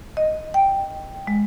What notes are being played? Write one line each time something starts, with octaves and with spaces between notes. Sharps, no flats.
D#5
G5
G#3